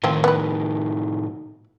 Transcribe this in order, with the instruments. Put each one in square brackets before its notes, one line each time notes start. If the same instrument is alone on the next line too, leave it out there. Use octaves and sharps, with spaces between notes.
[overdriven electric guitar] A2 D#3 [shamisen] F3 C4
[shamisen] B3 B4